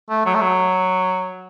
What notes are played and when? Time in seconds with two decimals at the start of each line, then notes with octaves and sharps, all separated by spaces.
0.10 A3
0.26 F#3
0.34 A3
0.41 F#3